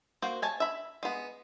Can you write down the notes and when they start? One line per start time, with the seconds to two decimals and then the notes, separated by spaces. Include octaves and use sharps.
0.22 A#3 F#4 C5
0.42 C#5 G#5 A5
0.60 E5 B5
1.03 G#3 B3